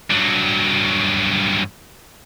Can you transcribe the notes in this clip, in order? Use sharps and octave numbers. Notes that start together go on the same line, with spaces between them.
G2 F#3